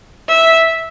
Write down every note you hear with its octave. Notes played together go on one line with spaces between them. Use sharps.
E5